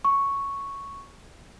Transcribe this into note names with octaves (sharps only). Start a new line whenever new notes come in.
C#6